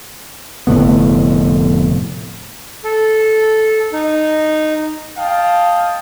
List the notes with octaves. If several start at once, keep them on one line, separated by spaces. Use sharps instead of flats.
F1 A2 D3 B3
A4
D#4
D#5 F5 G5 A5